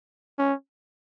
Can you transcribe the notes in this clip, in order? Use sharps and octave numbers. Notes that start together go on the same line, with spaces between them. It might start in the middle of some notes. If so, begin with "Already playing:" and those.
C#4